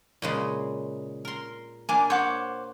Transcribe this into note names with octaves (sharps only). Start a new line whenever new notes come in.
A#2 C#3 G#3
A#4 C6
A#3 D4 G#5
C5 C#5 F#5 D6